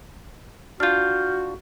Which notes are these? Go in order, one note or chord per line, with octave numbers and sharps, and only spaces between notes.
D4 F4 F#4 F6 G6